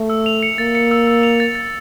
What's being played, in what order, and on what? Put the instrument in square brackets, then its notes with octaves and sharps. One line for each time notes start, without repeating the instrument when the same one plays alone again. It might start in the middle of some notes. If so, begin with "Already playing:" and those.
Already playing: [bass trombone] A3
[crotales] E6
F7
C#7
[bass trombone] A#3 [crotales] A6
[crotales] C#7
E6
E6
F7
A6
A6